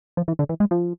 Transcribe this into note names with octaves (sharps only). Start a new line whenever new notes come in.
F3
E3
D3
E3
G#3
F3